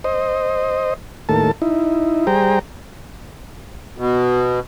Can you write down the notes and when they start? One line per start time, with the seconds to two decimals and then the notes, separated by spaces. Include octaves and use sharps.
0.04 C5 D#5
1.29 D#2 A2 A#3 A4 A5
1.62 D#4 E4
2.27 G3 G#4 C5 G5 A#5
3.98 B2